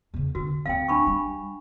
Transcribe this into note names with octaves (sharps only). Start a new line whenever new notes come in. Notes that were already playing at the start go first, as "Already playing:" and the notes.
E2 C#3
D3 F#4
D2 C4 F5 G5
D4 B5 C#6
G3